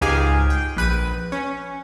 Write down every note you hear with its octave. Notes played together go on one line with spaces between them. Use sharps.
C#2 G#2 G4 G#4 F5 G#5
G5
A#1 B4 D#7
C#4